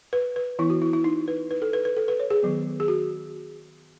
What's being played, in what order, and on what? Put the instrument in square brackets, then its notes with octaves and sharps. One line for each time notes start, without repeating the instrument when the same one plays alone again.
[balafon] B4
B4
E3 B3 E4
F#4
E4
E4
D#4
B4
B4
A4
B4
B4
A4
B4
C#5
G#4
D#3 F#3 B3
G#4
F#4